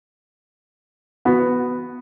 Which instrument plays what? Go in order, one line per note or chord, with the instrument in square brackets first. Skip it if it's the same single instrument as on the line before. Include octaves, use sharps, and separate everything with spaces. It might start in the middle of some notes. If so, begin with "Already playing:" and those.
[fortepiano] B3 F#4